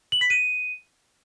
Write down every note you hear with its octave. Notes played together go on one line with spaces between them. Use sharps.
F#7
B6
D#7